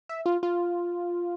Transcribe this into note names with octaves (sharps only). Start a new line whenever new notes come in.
E5
F4
F4